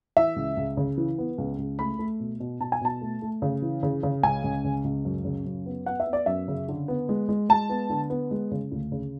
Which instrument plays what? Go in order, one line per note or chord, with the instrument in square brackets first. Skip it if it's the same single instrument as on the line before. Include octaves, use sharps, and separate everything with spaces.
[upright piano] E3 E5
C#2
C#2
C#3
E3
B3
C#2
C#2
A3 B5
A3
B2
B2
B2 A5
G#5
B2 A5
A3
A3
C#3
E3
C#3
C#3
C#2 G#5
C#2
C#3
C#2
F#2
C#3
F#2
B3
B3 F#5
E5
B3
D5
F#2 E5
C#3
D3
B3
G#3
G#3
G#3 A5
B3
D3
B3
G#3
C#3
D2
C#3